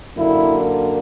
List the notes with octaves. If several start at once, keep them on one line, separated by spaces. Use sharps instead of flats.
F#2 D3 A#3 E4